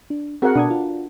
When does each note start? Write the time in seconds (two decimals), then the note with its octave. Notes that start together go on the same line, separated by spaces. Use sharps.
0.10 D4
0.42 C4 F#4 G#4 A#4 F#5
0.55 B2 D4 D#6 G#6
0.70 F4